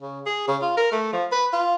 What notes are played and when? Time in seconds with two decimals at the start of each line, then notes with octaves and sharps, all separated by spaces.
0.01 C#3
0.26 G#4
0.48 C#3
0.62 F4
0.77 A#4
0.92 A3
1.13 F3
1.32 B4
1.53 F4